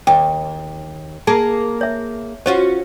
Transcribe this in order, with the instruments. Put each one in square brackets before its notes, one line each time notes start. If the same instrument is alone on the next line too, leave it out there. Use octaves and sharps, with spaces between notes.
[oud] D#2 [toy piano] G5
[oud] A#3 G#4 A#4 [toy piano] A5
[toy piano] C#5 E5
[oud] C#4 F4 F#4 [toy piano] C5